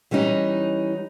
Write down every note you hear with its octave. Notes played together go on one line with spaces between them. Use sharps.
E3 G3 C#4 D#4